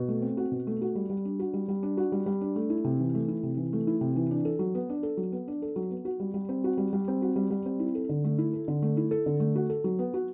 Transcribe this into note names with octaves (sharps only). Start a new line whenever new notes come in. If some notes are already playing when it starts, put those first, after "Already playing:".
Already playing: B2
A3
C4
F#4
B2
A3
F#4
G3
G3
D4
F#4
G3
G3
D4
F#4
G3
G3
D4
A3
E4
C3
E3
A3
E4
C3
E3
A3
E4
C3
E3
D4
A4
F#3
B3
D4
A4
F#3
B3
D4
A4
F#3
B3
F#4
G3
G3
C4
F#4
G3
G3
C4
F#4
G3
G3
C4
E4
A4
D3
A3
E4
A4
D3
A3
E4
A4
D3
A3
F#4
A4
F#3
B3
F#4